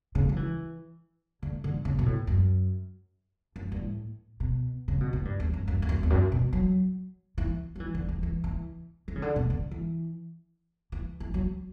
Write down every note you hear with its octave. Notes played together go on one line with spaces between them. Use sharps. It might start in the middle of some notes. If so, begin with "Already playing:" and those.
C#3
F#3
E3
D3
D3
C#3
B2
A2
F#2
F#2
G2
A2
B2
C#3
B2
A2
G2
E2
F#2
F#2
E2
F#2
E2
F#2
B2
F#3
E3
F#3
E3
D3
E3
E3
E3
E3
C#3
D3
B2
D3
E3
E3
E3
F#3